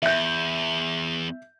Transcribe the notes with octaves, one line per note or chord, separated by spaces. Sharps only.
E2 E5 G6